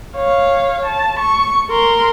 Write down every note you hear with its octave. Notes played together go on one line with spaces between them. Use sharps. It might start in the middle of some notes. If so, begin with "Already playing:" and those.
C#5 F5
A5
C#6
A#4 C6